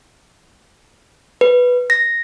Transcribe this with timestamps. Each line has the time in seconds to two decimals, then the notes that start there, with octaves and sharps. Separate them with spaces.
1.41 B4
1.90 A#6